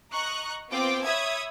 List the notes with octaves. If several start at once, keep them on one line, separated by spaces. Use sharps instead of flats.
D#5 A#5 C#6 F#6
B3 C4 F4 G5 D6
C#5 E5 B5 D#6 G#6